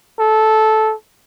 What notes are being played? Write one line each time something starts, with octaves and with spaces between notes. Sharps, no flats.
A4